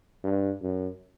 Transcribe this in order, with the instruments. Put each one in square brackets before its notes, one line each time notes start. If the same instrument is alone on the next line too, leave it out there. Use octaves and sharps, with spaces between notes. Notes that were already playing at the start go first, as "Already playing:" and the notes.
[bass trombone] G2
F#2